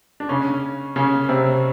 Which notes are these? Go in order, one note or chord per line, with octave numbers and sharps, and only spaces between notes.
D4
C#3 C#4
C#3 C#4
C3 C4